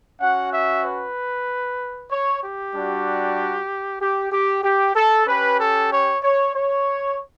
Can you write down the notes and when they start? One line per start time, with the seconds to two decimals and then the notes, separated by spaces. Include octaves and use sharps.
0.20 C#4 F#4 F#5
0.52 E5
0.84 B4
2.10 C#5
2.42 G4
2.73 G3 D4 F#4
4.01 G4
4.32 G4
4.64 G4
4.96 A4
5.27 C#4 G4 B4
5.59 A4
5.91 C#5
6.23 C#5
6.55 C#5